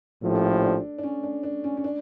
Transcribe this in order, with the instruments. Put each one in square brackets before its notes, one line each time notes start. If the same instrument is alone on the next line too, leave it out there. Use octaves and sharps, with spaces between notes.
[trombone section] A#1 A2 F3 C#4 G4 [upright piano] A4
[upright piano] D4
D4
C#4
D4
D4
C#4
C#4
D4